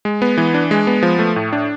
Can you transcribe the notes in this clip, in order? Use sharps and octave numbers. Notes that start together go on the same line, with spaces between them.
G#3
B3
E3
D4
G#3
B3
F3
A3
A2
D4